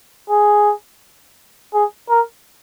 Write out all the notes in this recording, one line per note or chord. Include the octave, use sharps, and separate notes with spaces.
G#4
G#4
A#4